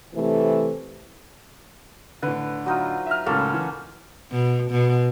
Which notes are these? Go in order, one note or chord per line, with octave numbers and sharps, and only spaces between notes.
C3 E3 A3
A2 D3 B4
F#3 D#4 F4
E5 A#5 F6
C#2 A2 A#3 C#4 A4
E3
B2
B2